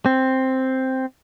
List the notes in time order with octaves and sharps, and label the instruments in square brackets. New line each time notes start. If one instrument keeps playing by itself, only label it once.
[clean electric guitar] C4